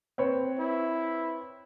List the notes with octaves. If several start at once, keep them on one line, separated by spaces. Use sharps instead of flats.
C4 B4 C#5
E4